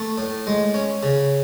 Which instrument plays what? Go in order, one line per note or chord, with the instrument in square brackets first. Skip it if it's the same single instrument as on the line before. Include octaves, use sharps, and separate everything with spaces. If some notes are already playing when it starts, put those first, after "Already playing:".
Already playing: [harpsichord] A3
A2
G#3
C#4
C#3